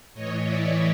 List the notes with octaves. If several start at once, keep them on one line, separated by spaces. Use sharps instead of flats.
A2 E3 C#5 D#5
D5 E5